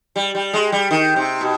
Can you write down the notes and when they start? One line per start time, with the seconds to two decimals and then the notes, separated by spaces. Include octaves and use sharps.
0.16 G3
0.35 G3
0.53 G#3
0.72 G3
0.91 D#3
1.16 C3
1.41 B2